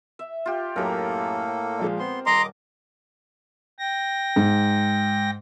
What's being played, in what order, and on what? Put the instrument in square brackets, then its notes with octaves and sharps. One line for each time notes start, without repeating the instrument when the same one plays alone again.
[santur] E5
F4 G4
[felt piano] F#2 G4 [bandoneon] A2 A#3 A4 [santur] A#4 D#5
[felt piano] A#2 F3 G#3
[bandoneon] B3 C6 [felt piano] C4
[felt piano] D#1 [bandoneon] D#5 D6 [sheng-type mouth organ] A#5 C6
[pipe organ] G5 A#6
[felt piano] G#2